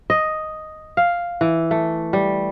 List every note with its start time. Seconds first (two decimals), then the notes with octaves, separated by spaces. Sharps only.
0.10 D#5
0.97 F5
1.41 E3
1.71 A3
2.13 G3